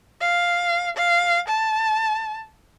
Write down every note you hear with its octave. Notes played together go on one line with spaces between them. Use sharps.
F5
F5
A5